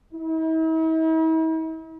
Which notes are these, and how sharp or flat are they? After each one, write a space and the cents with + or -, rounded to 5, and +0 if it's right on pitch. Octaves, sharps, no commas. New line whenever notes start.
E4 -45